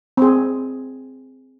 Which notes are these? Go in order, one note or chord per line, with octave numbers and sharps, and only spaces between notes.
C4 G#4